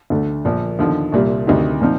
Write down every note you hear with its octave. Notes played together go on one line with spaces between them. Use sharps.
D2 D3 A3
A#1 A#2 F3
D#2 D3 F3
C2 A#2 G3
D2 C3 D#3 G3
A#2 F3 C4 D#4